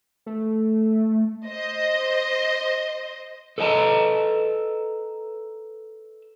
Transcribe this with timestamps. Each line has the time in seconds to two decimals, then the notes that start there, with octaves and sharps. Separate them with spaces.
0.26 A3
1.48 C5 D#5
3.58 A4 B4 D#5 G5 A5 A#5